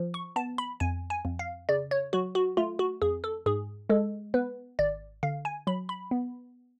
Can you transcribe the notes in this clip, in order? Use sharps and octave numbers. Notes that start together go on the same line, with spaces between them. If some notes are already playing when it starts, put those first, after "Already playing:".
Already playing: F3
C#6
B3 A5
B5
F2 G#5
G#5
F2
F5
C#3 D5
C#5
F#3 F#4
F#4
A3 F4
F#4
F2 G#4
A4
G#2 G#4
G#3 A4
B3 B4
G#1 D5
D3 F5
G#5
F#3 B5
B5
B3